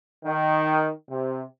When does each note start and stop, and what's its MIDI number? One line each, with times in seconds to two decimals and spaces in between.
0.25 0.89 51
1.09 1.42 48